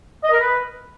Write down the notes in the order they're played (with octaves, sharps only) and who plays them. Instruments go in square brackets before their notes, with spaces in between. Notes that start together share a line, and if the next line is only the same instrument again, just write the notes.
[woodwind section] D#5
A#4
B4